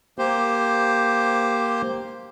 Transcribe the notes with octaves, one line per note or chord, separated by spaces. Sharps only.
A#3 G4 C5